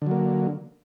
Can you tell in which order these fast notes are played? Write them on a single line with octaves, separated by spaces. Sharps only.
D3 F#3 A#3